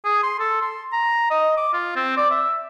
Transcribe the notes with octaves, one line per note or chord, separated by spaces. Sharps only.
G#4
C6
A4
C6
A#5
D#5
D6
F4
C4
D5
E5